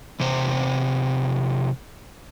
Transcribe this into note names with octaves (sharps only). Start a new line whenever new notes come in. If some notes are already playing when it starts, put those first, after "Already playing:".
E2 C3 C5